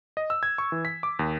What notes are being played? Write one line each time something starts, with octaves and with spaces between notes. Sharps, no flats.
D#5
E6
G#6
C#6
E3
B6
D6
D#2